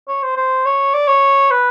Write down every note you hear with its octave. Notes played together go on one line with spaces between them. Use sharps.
C#5
C5
C5
C#5
D5
C#5
B4